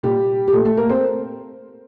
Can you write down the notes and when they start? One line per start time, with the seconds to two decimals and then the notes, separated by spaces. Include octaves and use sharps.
0.03 A#2 G3 G4
0.48 G4
0.52 A#2 A3 A4
0.65 A3 A4
0.77 A#3 A#4
0.89 C4 C5